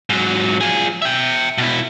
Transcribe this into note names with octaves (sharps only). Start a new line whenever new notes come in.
G#2 F#3
F3 G#4
E5 G5
B2 E4